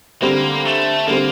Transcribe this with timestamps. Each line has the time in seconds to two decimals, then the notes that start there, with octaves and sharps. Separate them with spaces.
0.22 D3 G3 A#3 C4
0.65 A3
1.08 D3 G3 A#3 C4